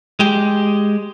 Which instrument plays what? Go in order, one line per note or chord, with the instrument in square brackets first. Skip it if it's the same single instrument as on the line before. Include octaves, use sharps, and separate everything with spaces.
[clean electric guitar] G#3 G4